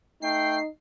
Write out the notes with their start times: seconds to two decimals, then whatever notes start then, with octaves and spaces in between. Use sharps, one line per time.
0.22 A3 D#4 G5 C7